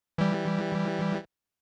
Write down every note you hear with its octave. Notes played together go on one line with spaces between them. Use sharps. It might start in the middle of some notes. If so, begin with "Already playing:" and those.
E3 G3